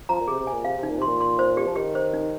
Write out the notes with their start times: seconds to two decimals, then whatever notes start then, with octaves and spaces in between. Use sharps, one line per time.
0.09 F3 A#5
0.21 A#2
0.27 C3 G#4
0.40 C3
0.47 G#5
0.53 A#2
0.65 C3 F5
0.77 C3
0.83 D#4
0.90 A#2
0.99 C3 C6
1.07 A#2
1.21 C6
1.39 C5
1.57 G4
1.67 F3
1.76 D#3 G4
1.95 C5
2.13 D#4